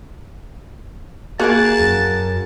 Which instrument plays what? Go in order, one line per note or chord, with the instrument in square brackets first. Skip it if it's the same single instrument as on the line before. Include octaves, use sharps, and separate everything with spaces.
[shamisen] A#3 [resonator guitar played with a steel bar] F#4 G#4 A#4 [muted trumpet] A5
[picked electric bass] F#2